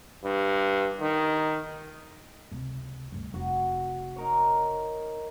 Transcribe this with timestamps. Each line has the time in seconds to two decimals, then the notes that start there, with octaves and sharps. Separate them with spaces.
0.24 G2
1.01 D#3
2.52 C#2 C3
3.12 D2 G2
3.34 F1 F#4
4.16 D#4 A#4 C#5